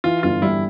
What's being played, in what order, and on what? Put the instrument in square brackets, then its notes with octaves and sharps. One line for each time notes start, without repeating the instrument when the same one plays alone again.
[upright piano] E3 [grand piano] F4
[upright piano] G1 [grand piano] F4
[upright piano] G3 [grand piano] E4